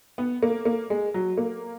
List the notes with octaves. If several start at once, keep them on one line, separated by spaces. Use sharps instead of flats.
B3
A#3
A#3
G#3
F#3
A#3